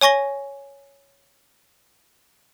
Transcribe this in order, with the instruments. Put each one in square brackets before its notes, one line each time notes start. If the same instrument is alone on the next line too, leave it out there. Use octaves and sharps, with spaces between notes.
[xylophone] C#5 G#5 C#6 A#6 G7